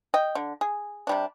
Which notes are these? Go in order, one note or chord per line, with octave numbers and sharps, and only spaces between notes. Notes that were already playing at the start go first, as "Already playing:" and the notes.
D#5 G5
D3
G#4
C3 G3 D4